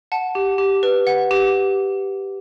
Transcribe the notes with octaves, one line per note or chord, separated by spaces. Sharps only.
F#5 A5
G4
G4
B4
F#5
G4